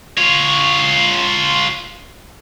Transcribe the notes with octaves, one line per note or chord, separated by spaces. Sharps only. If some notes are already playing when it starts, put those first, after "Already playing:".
F4 C#5